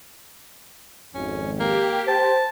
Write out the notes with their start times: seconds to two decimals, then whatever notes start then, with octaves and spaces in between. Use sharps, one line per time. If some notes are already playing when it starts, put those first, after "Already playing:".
1.15 G#1 F2 C#4
1.60 A#3 G4
2.08 C5 A5